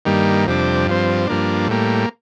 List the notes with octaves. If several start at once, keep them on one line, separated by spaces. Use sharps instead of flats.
G2 D#3 G3 A#3
F2 C3 G3 D4
G2 F3 C4
G2 F3 A#3 D4
A2 G3 A#3